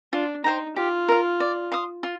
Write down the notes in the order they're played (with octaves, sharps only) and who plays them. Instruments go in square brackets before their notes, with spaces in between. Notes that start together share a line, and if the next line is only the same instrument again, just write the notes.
[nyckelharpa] D4 [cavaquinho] F4
[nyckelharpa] D#4 [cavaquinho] C5 G5 A#5
[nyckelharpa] F4 [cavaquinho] G4
[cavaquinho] A#4 F5
D5
F5 C6 D#6
F4